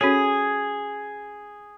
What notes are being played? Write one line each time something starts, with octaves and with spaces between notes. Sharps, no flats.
C#4 F#4 G#4 A4 C#5